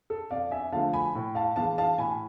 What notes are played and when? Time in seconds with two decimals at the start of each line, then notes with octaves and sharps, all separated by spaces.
0.10 A4
0.31 F2 D5 F5
0.51 E5 G#5
0.72 D3 F3 A3 F5 A5
0.93 G#5 B5
1.15 A2
1.35 F5 A5
1.56 E3 G#3 F5 A5
1.78 F5 A5
1.98 A2 G#5 B5